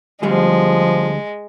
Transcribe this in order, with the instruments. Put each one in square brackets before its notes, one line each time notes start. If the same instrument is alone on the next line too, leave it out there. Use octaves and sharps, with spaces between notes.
[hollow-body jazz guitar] D2 G3 G#4 [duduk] F3 [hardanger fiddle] G#3